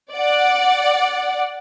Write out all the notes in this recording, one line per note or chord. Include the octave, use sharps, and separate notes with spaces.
D5 F#5